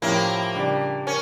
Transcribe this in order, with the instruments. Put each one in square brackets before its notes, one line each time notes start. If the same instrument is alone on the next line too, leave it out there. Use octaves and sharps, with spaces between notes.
[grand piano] A2 F3 C#4 E4 G4 [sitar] A#3
[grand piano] C#3 G3 D4 G4 D5
[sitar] C#4 [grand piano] A#4